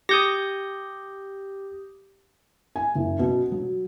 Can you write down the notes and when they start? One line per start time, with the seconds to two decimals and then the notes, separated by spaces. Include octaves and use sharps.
0.09 G4 D#6 G6 A#6
2.76 G#5
2.95 F#1
3.19 B2
3.52 F#3